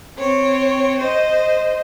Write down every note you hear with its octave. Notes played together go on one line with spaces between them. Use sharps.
C4 C#5
C5 D#5